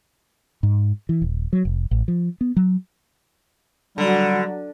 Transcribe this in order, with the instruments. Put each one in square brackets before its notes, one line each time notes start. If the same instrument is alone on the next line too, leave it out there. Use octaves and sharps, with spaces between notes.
[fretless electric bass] G#2
E3
D#1
F#3
F1
A1
F3
B3
F#3
[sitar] D3 [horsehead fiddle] F#3 F#4 [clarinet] G3